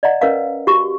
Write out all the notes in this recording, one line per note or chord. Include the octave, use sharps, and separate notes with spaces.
D5 D#5 F#5 A#5
C#4 A#4 B4 D#5 F5 A#5
F#4 G4 C#6